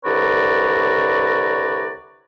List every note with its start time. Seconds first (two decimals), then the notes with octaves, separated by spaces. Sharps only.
0.04 C2 D3 B4 C#5 D5 A#5